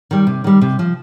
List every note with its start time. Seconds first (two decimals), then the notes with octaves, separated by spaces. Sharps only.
0.11 D#3 G3
0.27 C3
0.44 D#3 G3
0.61 C3
0.79 F3